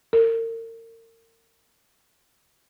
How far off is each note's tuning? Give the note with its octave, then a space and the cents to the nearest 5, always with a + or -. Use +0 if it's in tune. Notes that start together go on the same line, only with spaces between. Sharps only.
A#4 -35